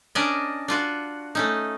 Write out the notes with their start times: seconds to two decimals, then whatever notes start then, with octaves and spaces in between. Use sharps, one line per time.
0.15 C#4 D4 A#4 D5 D#5
0.68 D4 F4 F#4
1.35 A3 C#4 D#4